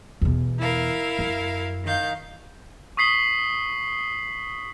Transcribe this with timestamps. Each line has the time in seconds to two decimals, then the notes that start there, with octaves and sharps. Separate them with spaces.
0.21 E2 B2
0.59 E4 A#4 F5
1.19 F#2
1.85 D#3 F5 G6
2.97 C#6 D#6 B6 C7 F#7 G7